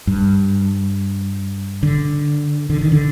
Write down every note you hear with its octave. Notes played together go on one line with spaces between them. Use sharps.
G2
D3
D3
D#3
D3